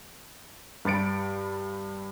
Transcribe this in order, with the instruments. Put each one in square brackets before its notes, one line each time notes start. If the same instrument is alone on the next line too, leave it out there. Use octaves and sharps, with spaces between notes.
[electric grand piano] G2 G4 B5 A6 C#7 D7